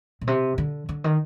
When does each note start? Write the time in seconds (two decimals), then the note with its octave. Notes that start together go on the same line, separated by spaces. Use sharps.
0.21 A#2
0.27 C3
0.58 D3
0.89 D3
1.04 D#3